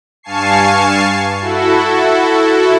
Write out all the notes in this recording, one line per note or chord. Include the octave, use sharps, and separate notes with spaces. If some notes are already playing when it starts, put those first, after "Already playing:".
G2 F5 G#5 A5 C#6 C7
E4 F#4 A4